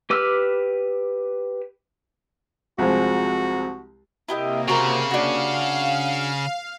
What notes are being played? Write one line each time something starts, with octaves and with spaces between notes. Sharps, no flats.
G4 B4 D6 E6 F6
C2 F3 G#3 F#4
C3 A#3 E4 G4 D#5
C#3 F#4 A#4 C5
D4 F#4 F5